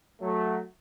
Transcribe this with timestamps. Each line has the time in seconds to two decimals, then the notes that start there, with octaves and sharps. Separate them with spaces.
0.21 F#3 A3